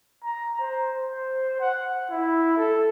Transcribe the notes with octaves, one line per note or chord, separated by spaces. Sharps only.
A#5
C5
C5
F#5
E4
A4